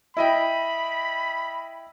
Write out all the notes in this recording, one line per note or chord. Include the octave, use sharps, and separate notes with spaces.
E4 D#5 G5 B5